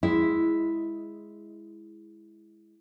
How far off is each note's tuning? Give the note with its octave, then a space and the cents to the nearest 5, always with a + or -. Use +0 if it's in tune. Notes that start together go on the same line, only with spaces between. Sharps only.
G#3 +0 E4 +0